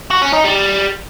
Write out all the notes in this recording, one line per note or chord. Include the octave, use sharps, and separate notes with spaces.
F#4
C#4
D#4
G3